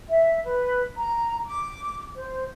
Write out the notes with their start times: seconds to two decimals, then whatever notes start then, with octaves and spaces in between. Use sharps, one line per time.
0.08 E5
0.45 B4
0.96 A#5
1.46 D6
2.16 C5